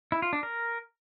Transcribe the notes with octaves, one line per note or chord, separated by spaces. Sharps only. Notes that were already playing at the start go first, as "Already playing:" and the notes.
E4
F4
D4
A#4